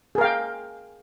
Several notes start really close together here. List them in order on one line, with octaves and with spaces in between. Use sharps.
G#4 A#4 F5 G5